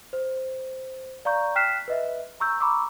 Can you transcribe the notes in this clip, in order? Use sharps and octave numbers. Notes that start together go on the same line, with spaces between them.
C5
D5 F5 A#5 C#6 G6
G5 F6 F#6 B6 C7 E7
B4 D#5 E5
A#5 C#6 E6 G6
A#5 B5 C#6 D6 E6